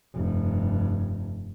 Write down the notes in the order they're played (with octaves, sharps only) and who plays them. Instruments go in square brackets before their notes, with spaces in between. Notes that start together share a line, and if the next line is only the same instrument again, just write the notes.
[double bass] F1 G2